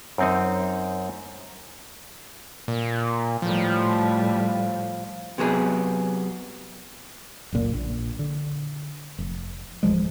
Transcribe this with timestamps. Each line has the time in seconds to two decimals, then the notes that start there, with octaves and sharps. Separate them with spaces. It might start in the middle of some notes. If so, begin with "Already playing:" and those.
0.18 F#2 C4 D#4
2.68 A#2
3.42 A2 F3 G3
5.38 C3 F#3 B3 G#4
7.52 F#1 C#2 A#2
7.73 A#1
8.19 D3
9.18 F1
9.83 D1 F2 F3 G#3